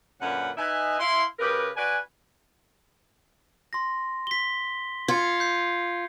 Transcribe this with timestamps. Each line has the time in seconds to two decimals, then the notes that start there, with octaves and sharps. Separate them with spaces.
0.21 F#2 A#2 D3 C#4 B4 F#5
0.57 D#4 B4 D#5 E5 G#5
1.00 E4 F5 C6
1.39 C#3 G4 A#4 B4
1.76 F#4 B4 D5 G#5
3.73 C6 A#6
4.27 B6 G7
5.08 F4 G#6 C#7
5.40 G6 C7